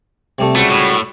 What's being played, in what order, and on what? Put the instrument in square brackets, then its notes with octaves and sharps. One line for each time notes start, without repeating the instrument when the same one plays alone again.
[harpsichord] C3 G3 A3
[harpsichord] C#2 C5 [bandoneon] G3 F#4 [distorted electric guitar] A3
[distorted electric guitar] A2